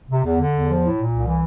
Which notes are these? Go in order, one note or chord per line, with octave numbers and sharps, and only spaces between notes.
C3
E2
D3
E2
F3
A2
A#2
C2
E3